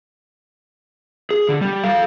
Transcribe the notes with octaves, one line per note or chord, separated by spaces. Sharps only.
G#4
D3
G3
A4 F5